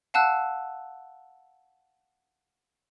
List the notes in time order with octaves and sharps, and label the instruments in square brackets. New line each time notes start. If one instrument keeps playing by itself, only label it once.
[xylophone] F5 F#5 A5 E6 F#6